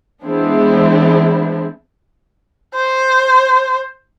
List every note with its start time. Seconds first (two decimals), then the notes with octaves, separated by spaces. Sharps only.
0.23 E3 G#3 B3 C4 D4 E4
2.75 C5